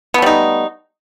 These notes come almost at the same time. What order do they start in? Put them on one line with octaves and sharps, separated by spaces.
B3 A3 G3 D#4